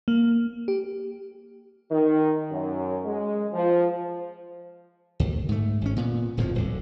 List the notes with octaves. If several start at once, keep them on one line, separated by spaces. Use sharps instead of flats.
A#3
G4
D#3
F#2
G#3
F3
D2
G#2 A3
G#1 C#4
A#2 B3
D1 F2 A2 F3
D1 D3